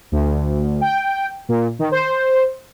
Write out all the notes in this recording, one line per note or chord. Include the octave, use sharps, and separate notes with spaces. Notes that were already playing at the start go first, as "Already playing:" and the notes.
D2
G5
A#2
D#3
C5